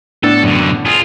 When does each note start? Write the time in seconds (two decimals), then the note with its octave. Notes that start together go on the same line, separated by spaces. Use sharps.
0.23 A2 B3 D4 A4
0.43 F#2 D3
0.86 F4 G#4